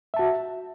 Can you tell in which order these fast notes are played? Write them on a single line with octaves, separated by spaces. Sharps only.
E5 A5 F#4